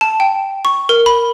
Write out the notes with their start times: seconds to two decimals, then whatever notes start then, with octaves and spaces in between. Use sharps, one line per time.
0.01 A5
0.20 G5
0.65 C#6
0.89 A#4
1.06 B5